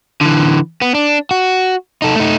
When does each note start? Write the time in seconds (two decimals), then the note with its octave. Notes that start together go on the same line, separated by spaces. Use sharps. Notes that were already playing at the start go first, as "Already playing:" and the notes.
0.21 D3 E3
0.82 B3
0.95 D4
1.31 F#4
2.02 D#4 A4
2.16 A3 D#4